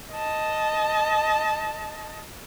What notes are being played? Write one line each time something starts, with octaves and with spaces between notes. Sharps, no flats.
D#5 A5